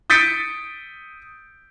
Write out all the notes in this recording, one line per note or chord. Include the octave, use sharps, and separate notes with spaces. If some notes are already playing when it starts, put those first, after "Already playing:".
D#6 G6 A6 B6 C#7 D7